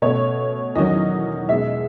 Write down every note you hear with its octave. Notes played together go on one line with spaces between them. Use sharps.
B2 A3 C#4 C#5
E2 D#3 F#3 C#4 D#5
B2 G#3 C#4 E5